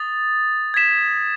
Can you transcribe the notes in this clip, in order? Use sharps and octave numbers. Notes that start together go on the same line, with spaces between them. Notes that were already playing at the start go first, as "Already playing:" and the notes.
Already playing: D#6 A6
G#6 B6 E7